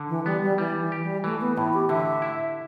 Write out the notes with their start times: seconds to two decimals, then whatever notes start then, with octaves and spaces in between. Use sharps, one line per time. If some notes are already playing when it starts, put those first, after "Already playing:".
Already playing: D3
0.09 E3
0.26 G3 B3
0.42 G3
0.58 E3 G3
0.81 E3
0.92 G4
1.02 G3
1.24 E3 A3
1.41 B3
1.57 A2 E4
1.74 G4
1.89 D3 E5
2.22 E4